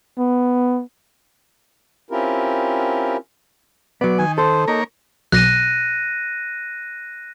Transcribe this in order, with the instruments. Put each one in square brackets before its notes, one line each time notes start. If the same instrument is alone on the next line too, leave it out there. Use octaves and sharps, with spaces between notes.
[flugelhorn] B3
[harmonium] C4 C#4 E4 F4 G4 A#4
[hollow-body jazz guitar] F#3 B3 [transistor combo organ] D5
[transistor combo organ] D#3 [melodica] G#5
[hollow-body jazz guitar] A4 [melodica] C5
[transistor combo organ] A#3 A#4 C#5 [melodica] D#4
[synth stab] B1 [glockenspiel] F#6 A#6 D#7